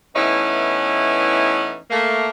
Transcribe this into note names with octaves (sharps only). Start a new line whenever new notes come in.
E3 A3 B3 C#4 D#4 E4
A3 A#3